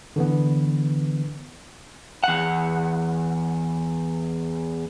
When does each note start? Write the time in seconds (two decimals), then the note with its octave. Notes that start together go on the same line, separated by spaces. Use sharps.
0.16 D3 E3 B3
2.24 E2 F#5